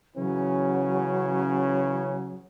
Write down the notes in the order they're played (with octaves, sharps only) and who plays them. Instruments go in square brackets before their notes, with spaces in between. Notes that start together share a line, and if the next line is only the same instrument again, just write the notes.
[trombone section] C#3 E3 C#4 [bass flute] F#3